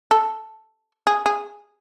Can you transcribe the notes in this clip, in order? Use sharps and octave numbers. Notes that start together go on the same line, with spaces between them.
A4
G#4
G#4